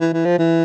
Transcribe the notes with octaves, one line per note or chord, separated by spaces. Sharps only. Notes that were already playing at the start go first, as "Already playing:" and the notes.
E3
E3
F3
E3